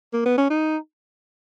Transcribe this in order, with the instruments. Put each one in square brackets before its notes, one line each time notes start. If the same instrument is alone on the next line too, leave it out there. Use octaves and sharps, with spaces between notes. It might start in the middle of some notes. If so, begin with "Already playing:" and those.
[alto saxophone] A#3
B3
C#4
D#4